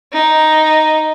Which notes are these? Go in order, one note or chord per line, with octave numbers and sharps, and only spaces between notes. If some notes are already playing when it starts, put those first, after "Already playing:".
D#4